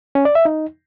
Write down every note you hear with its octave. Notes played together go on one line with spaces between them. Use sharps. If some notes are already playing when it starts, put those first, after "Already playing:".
C#4
D5
E5
D#4